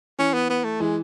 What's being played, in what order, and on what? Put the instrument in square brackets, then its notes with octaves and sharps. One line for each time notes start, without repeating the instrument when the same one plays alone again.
[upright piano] E3 [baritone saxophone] C#4
[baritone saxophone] B3
B3
A3
[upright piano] E3 [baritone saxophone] G#3